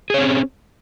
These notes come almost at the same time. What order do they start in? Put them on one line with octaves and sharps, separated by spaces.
G#4 C#5 C4 C#4